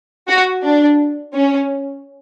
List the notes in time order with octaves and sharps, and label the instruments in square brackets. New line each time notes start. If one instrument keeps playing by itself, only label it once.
[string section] F#4
D4
C#4